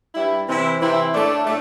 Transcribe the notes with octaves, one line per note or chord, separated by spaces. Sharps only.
G2 G3 E4
C3 E3 C4 E4
C3 E3 C4 E4
A2 A3 D4 A4 D5
A2 A3 D4 A4